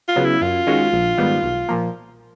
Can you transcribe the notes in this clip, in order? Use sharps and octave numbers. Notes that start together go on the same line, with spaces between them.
F4
C#3 F#3 B3
E4
F#2 F4
D#3 G#3 C#4 F#4
A#1
G#2 D#3 G3 B3
B1
A#2 F3 A#3